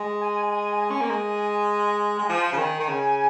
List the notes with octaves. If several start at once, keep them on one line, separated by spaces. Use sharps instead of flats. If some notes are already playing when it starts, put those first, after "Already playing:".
Already playing: G#3
G#5
G#5
G#5
C#4
A#3
G#3
G#3
G#5
F3 F5
C#3
D#3 G#5
D#3
C#3